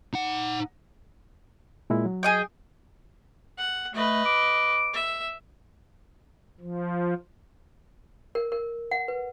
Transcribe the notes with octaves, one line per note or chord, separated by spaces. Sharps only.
D#4 F#5
A#2 G#3 E4
F#3
G#4 D#5 G5
F#5
A3 B4 D#5
D6
E5
F3
A#4
A#4
F#5
B4